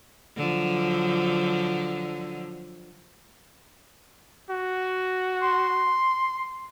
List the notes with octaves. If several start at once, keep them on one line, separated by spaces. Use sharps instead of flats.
D3 F3 F#3
F#4
C6